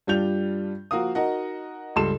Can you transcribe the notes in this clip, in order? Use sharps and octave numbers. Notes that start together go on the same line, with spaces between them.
G2 G3 D4 F4 G6 F7
F3 A#3 F#4 A#4 F5 D#6
D#4 F#4 A#4 D#5 F#5
C#2 G2 A4 C6 E7